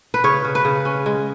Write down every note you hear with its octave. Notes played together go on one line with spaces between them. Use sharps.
B4
C#3 C#5
C#3
B4
C#3
C#4
G#3